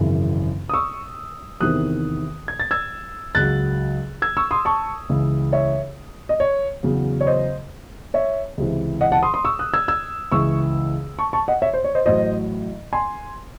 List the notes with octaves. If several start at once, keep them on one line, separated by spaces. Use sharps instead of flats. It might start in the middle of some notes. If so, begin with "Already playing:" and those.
Already playing: G#1 F#2 C#3 E3
D#6
C#6 E6
E2 C3 D#3 D#6 F#6
G#6
A6
E6 G#6
C#2 C#3 F#3 F#6 A6
E6 G#6
C#6 E6
C6 D#6
A5 C#6
C#2 C#3 E3
C#5 E5
D#5
C#5
E2 C#3 F#3
C#5
C5 D#5
C#5 E5
C#2 C3 E3
D#5 F#5
F#5 A5
C6 D#6
C6 D#6
C#6 E6
D#6 F#6
E6 G#6
E6 G#6
C#2 C#3 E3 C#6 E6
A5 C#6
A5 C#6
D#5 F#5
C#5 E5
C5
C#5
C5 D#5
A1 A2 F#3 C5 D#5
G#5 C6